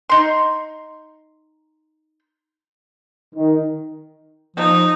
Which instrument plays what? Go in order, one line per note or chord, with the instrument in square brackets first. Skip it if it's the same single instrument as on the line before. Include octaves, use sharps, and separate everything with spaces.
[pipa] D#4 C6
[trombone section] D#3
[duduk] F3 [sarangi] D#4